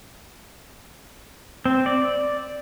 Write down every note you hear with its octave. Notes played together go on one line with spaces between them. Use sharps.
C4
D5